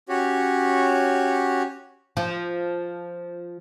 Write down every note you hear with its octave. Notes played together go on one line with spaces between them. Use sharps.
C#4 F#4 G4 C#5
F3